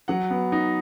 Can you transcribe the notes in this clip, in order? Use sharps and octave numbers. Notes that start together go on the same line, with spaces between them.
F#3 F#5
B3
D#4